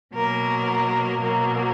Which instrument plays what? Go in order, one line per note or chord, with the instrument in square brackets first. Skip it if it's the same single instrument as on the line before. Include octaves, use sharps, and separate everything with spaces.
[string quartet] B2 F#3 A#3 A#4
B2 F#3 A#3 A#4